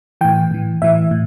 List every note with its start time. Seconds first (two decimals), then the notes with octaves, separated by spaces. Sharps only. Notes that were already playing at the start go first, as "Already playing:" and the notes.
0.21 A2 E3 G5
0.51 A2 E3
0.82 A2 E3 E5
1.11 A2